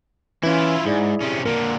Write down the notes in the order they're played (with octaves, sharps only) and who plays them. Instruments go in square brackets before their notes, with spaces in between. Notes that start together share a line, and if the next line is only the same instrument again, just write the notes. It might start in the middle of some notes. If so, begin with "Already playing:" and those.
[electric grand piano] E3 C#4 [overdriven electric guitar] E4 F4
[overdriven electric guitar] G#2 [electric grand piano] E4 G#4 D5
[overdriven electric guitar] C3 C#4
[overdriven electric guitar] A#2 D3 [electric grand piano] A#4